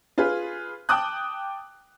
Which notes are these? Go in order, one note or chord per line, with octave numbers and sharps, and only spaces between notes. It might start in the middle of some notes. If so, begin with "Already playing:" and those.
F4 G#4 B4
G5 A5 D6 D#6 F#6